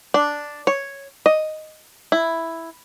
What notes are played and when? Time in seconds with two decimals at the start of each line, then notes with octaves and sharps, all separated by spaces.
0.14 D4
0.67 C#5
1.26 D#5
2.12 E4